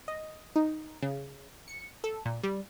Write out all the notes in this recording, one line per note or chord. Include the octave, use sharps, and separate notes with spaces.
D#5
D#4
C#3
C#7
A4
A#2
G3